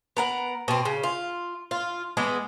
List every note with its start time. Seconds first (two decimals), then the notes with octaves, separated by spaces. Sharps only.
0.17 B3 A#4 F#5
0.68 B2 C4
0.85 C#3
1.03 F4
1.71 F4
2.17 E3 G#3 B3 D#5